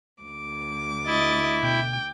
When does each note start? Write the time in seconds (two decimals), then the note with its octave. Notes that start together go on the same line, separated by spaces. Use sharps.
0.22 D2 D6
1.07 E4 D#5 A6
1.63 B2 G5